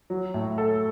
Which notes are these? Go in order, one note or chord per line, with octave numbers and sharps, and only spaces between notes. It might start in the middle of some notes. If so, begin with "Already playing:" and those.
F#3
A2
A4